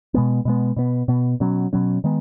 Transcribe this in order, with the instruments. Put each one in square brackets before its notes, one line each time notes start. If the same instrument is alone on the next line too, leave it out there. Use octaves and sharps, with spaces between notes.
[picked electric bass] B2 G#3 B3
B2 G#3 B3
B2 B3
B2 B3
B2 F#3 C#4
B2 F#3 C#4
D#3 G#3 B3